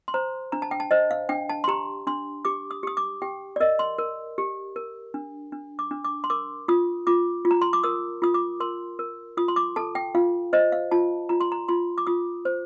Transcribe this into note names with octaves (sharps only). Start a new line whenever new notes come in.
C6
C5 A#5
D4 A#5
A5
G5
A5
C5 D#5
F5
D4 G5
A5
C6
G4 A#5
D4 C6
G4 D6
D#6
G4 D#6
D6
G4 G5
D5
A#4 D#5
C6
A#4
G4
A#4
D4
D4
D6
D4
D6
C6
A#4 D6
F4 D#6
F4 D6
F4
A#5
C6
D6
A#4 D#6
F4 D#6
D6
A#4 C6
A#4
F4 D#6
C6
D6
A4 A5
G5
F4 F5
C5 D#5
F5
F4 A5
F4 A#5
C6
A#5
F4 C6
D6
F4 D#6
C5